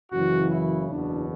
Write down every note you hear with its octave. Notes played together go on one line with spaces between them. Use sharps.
F#1 F#2 C#3 E3 F#4
E4
F#1 E2 B2 D4